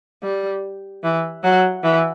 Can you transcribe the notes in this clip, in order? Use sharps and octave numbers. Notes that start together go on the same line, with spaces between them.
G3
E3
F#3
E3